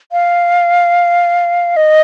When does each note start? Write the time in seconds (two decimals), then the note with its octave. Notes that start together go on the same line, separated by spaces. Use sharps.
0.12 F5
1.77 D#5